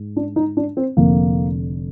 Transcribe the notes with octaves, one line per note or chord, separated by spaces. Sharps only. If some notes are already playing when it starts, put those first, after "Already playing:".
Already playing: G#2
D4
D#4
D4
C4
F1 F2 D3 A#3